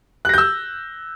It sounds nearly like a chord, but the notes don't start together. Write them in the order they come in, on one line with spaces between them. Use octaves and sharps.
F#6 A#6 G6 E6